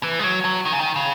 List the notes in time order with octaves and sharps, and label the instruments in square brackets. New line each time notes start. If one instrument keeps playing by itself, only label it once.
[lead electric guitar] E3
G#3
F#3
F#3
D#3
C#3
D#3
C#3